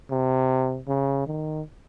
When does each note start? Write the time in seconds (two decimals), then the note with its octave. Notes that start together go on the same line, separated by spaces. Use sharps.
0.11 C3
0.88 C#3
1.27 D#3